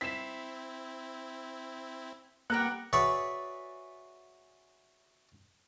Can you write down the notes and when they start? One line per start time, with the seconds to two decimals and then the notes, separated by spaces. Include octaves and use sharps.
0.01 C4 E4 B6 C7 E7
2.50 A#3 B3 G4 A#4 F#5 F#6
2.93 F#4 G#4 B4 C#5 D5 E5